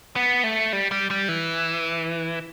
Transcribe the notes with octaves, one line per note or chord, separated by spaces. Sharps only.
B3
A3
G3
G3
G3
E3